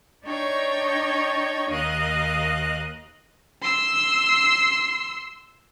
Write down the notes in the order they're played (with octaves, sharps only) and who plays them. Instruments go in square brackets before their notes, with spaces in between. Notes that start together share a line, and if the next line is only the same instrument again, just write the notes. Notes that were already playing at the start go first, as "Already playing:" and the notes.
[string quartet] D4 D#4 C#5 G5 C#6
D#2 A#4 D#5 F5 F#6
[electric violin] C6 E6